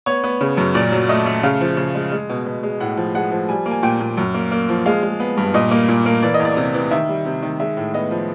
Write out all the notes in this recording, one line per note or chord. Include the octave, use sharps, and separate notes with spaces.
B3 C#5
B3
C#3
F#2
A#2 D5
F#3
A3 D#5
A3
C#3 F5
F3
C#3
G#3
G#3
B2
B2
G#3
A2 F#5
F3
G#3 F#5
F3
G3 G#5
A#3
G#5
A#2 G5
A#2
F#2
A#3
A#3
F3
G#3 F5
G#3
B3
G2
A#2 D#5
A#3
A#2
A#3
E3 D5
D#5
E2
D5
C3
E3
D#3 E5
G3
C3
D#3
G#3 E5
A2
B3 D#5
F3